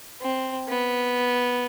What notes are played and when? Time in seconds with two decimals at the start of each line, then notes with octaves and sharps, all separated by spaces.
0.21 C4
0.68 B3